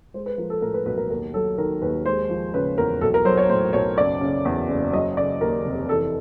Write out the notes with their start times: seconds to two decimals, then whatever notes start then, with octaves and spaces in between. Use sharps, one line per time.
0.14 G#3 C5
0.26 B4
0.38 F3 A#4
0.50 A4
0.62 A2 A#4
0.74 B4
0.86 B1 B4
0.98 A#4
1.10 D#2 A#4
1.34 F#3 A4
1.58 D#3 A#4
1.82 D#2 B4
2.06 G#3 C5
2.30 F3
2.54 C#3 B4
2.78 E2 A#4
3.01 B1 A4
3.14 A#4
3.25 F#3 C5
3.37 C#5
3.50 A2 C5
3.73 B1 C#5
3.98 F#1 D5
4.21 C#3
4.45 E2
4.69 F#1
4.93 F#3 D#5
5.17 C#3 D5
5.41 D#2 A#4
5.65 F1
5.89 E3 A4